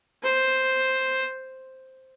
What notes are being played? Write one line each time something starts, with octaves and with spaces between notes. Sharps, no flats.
C5